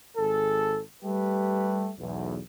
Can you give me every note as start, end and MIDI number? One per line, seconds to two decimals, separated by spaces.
0.17 0.80 32
0.17 0.80 68
0.17 0.80 69
1.02 1.89 55
1.02 1.89 57
1.02 1.89 67
1.02 1.89 71
1.98 2.39 35
1.98 2.39 40